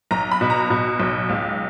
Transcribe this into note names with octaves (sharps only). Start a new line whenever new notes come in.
B1 A#5
B5
B2
A#5
B2
B1
C#2